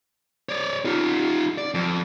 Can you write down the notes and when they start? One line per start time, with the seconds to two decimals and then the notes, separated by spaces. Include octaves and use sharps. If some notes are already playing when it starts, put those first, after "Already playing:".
0.49 C#5 D5
0.85 D#4 F4
1.58 D5
1.74 F2